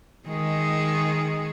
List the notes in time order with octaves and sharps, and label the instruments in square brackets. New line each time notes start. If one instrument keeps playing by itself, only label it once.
[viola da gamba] D#3 G#3 G#4